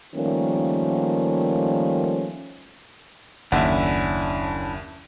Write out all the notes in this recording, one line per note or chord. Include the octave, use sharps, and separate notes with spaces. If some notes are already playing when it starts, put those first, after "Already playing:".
D#3 F3 G3 A3 A#3 C#4
F#1 D#2 C#4 D4 E4 E5 F#5